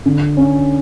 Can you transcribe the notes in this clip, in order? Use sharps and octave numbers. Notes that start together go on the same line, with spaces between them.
D3
C#4